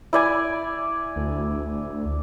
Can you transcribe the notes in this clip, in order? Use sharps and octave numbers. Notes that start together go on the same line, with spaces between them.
E4 D5 G#5
D2